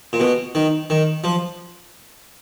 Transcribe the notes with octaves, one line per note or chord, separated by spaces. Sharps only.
A#2
B2
D#3
D#3
F3